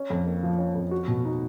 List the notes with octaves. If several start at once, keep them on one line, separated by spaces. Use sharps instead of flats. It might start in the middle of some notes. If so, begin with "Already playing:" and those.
Already playing: C#4
F2
A#3
F3
C#4
F2
F#4
B2
D#4